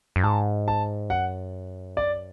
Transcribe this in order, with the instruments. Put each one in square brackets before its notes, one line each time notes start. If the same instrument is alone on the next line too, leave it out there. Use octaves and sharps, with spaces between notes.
[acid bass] F#2
[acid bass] G#2 [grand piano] A5
[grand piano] A5
[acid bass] F#2 [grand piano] F#5
[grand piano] D5